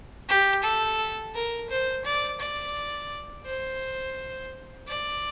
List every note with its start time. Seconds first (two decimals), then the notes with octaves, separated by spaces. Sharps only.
0.29 G4
0.64 A4
1.35 A#4
1.70 C5
2.05 D5
2.41 D5
3.46 C5
4.88 D5